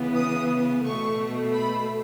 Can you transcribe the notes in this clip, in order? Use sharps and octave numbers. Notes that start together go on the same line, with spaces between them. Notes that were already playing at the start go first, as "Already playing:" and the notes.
Already playing: C#3 E3 B3
D#6
B2 A3 C#6
B5